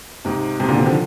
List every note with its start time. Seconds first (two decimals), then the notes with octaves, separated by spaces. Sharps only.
0.25 G#2 C3
0.60 G#2 C3
0.68 A#2 D3
0.78 C3 D#3
0.86 D3 F3